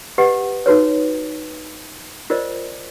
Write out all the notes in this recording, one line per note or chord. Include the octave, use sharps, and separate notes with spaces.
G4 B4 D#5 F#5
D#4 F#4 B4 C#5
F4 A#4 C5 D5 D#5